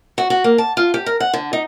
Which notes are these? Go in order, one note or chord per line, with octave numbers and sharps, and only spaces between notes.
F#4
F#4
A#3
A5
F4
G4
A#4
F#5
D3
D#4